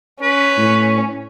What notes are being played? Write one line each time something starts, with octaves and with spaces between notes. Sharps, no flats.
C#4 B4
A2